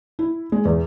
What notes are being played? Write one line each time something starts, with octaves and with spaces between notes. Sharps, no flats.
E4
G#3
E2